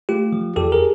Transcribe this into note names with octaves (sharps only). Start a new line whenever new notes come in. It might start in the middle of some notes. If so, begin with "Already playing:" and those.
A3 F4 G4
F3
E2 G4 A4
G#4 A#4